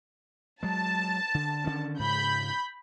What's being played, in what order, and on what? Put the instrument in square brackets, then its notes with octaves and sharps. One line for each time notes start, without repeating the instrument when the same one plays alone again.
[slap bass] F#3 G#3 [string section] A5
[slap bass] D3
D3 D#3 C#4
[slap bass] G#2 C#3 [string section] B5 G6